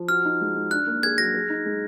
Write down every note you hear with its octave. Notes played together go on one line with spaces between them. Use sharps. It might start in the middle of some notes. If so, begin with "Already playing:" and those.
Already playing: F3
F#4 F6
D#4
G#3
G#3
D4 F#6
A#3
G#4 G#6
F#3 A#6
G#4
D#4
G#3